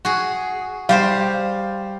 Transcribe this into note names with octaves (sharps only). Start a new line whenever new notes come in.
F#4 G#4
G3 G4 C5 F5